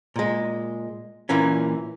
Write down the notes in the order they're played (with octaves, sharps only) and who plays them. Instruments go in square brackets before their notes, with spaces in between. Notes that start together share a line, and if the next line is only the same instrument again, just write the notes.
[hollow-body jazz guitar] A#2 G#3
A#2 E3 A#3 C#4